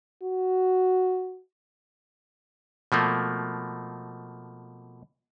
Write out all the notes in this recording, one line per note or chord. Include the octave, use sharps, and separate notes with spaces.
F#4
B2 F3 A3 A#3